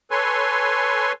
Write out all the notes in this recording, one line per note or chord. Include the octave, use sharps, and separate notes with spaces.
A4 B4 C#5 G#5 C6